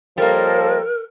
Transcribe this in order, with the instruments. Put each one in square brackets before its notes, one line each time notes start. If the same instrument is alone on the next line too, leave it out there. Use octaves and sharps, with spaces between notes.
[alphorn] F3 [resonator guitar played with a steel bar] G3 A#3 [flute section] A4 C#5 D#5 [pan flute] A#4